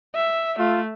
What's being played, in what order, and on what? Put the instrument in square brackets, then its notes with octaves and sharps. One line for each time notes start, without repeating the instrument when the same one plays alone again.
[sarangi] E5
[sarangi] A3 [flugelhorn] F4